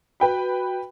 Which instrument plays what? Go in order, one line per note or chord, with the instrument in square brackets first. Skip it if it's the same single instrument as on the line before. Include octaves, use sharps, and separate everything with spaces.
[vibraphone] F#4 [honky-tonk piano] B4 G5 B5